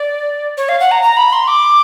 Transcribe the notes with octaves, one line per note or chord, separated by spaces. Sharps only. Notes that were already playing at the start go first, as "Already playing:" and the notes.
Already playing: D5
C#5
F5
F#5
A#5
A#5
B5
C6
D6